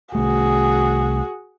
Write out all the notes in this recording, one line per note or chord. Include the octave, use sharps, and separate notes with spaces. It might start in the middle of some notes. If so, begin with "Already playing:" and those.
C2 A3 F#4 G#4